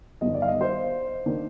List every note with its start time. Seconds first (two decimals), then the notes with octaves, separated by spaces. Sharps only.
0.21 G1 G2 D#3 D#5
0.34 D5
0.42 F5
0.48 D#5
0.61 C5
1.26 D#3 A#3 D4